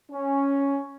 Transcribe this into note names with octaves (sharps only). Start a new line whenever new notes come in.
C#4